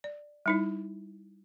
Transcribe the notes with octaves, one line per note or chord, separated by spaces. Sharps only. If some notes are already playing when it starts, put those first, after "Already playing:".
D5
G3 D#4 E4